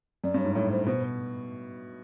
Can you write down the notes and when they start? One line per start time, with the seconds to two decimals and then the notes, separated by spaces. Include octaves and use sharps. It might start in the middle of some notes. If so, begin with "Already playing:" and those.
0.24 F#2 D5
0.34 G2
0.39 C#5
0.45 G#2
0.55 A2 C#5
0.72 C5
0.86 B2 C5